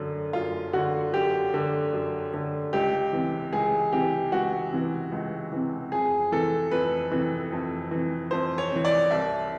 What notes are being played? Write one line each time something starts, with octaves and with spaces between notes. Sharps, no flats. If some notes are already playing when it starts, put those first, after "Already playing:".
Already playing: F#2 D3
F#2 F4
D3 F#4
F#2 G4
D3
F#2
D3
C#2 G4
C3 E3
C#2 G#4
C3 E3 G4
C#2 F#4
C3 E3
C#2
C3 E3
F2 G#4
C3 E3 A4
F2 B4
C3 E3
F2
C3 E3
F2 C5
C#5
C3 E3
D5
C2 E5